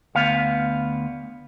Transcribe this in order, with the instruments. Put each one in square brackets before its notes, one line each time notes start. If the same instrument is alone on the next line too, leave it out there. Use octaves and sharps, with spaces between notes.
[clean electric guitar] D2 B3 F5